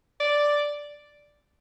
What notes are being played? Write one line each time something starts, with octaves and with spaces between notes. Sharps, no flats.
D5